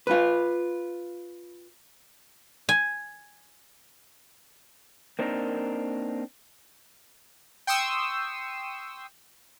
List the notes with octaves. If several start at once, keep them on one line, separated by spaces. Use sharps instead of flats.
F4 B4
G#5
A#3 C4 D4 D#4 F4 A#4
G5 C6 C#6 D#6 E6